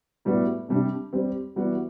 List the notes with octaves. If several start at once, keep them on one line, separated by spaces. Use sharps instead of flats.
A2 G3 B3 F#4
C3 G3 D4 G4
G3 C4 G4
E3 G3 B3 F#4